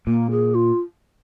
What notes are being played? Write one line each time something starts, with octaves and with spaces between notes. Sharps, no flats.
A#2 A#3
G#4
F4